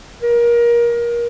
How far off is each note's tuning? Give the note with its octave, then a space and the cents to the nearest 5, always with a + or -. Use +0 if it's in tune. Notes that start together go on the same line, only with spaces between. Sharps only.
A#4 +25